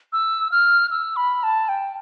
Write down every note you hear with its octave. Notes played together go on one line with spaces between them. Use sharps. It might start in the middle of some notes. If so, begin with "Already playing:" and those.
E6
F6
E6
B5
A5
G5